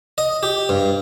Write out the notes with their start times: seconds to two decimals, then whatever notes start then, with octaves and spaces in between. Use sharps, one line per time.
0.18 D#5
0.43 G4
0.69 G2